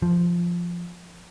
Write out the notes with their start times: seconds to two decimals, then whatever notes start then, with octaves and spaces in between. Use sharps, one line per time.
0.02 F3